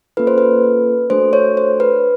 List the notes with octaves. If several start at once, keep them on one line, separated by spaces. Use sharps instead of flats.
A#3 C#4 F4 A4 B4
C5
B4
A3 D4 F#4 A4 C5
C#5
C5
B4